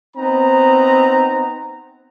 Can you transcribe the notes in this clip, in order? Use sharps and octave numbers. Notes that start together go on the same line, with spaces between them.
B3 C4 D#4 A#5